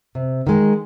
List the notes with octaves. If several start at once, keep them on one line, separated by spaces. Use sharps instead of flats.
C3
D#3 G#3